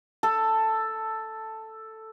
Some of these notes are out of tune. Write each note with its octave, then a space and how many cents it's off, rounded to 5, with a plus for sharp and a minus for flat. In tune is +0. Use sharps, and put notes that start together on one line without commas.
A4 +5